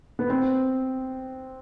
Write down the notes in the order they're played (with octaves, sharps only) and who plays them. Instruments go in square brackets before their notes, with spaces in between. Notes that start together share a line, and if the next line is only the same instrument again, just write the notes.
[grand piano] B3
C4